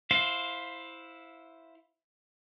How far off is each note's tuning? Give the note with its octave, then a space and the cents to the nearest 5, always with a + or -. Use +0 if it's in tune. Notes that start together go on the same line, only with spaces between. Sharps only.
E4 +0 C5 +0 F5 +20